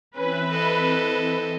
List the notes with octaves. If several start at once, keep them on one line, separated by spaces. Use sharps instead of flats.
E3 C4 C#4 B4 E5
A4 D#5